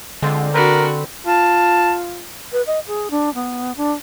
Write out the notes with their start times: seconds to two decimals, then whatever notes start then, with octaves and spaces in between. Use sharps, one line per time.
0.23 D3 G#3 C4 F4
0.54 C4 D4 F#4 A#4 B4
1.26 F4 A5
2.53 B4
2.67 D#5
2.87 G#4
3.11 D4
3.34 B3
3.77 D4